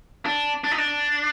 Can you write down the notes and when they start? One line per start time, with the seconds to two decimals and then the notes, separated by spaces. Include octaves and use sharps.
0.25 D4
0.64 D4
0.71 D#4
0.78 D4